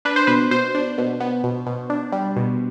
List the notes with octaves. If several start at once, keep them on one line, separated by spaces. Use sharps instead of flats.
D4 B4
C5
B2 B4
B2 C5
D4
B2
B3
B2
B2
D4
G3
B2